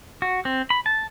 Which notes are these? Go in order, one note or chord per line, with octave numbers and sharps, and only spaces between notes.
F#4
C4
B5
A5